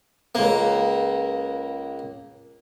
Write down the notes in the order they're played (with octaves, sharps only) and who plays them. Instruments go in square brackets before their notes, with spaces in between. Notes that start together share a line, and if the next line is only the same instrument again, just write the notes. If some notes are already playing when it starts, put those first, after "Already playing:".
[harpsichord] C#2 A#3